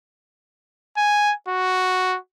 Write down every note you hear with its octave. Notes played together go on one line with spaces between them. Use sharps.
G#5
F#4